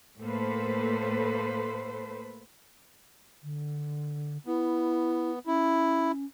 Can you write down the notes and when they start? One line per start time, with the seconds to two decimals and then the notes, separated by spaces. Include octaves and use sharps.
0.20 A2 A#3 A4 B4 C5
3.43 D3
4.46 B3 E4
5.47 C#4 E4